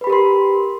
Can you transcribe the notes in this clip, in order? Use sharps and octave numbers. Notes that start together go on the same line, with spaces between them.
G4 A#4 B4 B5 C6